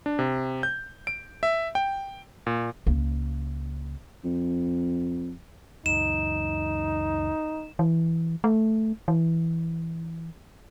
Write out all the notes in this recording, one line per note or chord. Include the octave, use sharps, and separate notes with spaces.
D4
C3
G6
D7
E5
G5
A#2
C#2 A#3
F2
C#2 F#2 D#4 E7
E3
A3
E3